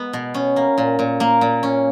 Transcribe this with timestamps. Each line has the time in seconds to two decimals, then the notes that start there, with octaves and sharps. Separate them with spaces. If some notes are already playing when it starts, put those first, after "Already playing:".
Already playing: G#3 B3
0.13 B2
0.34 C#4
0.56 A#3
0.78 A#2
0.99 A#2
1.20 A#3
1.41 A#2
1.63 C#4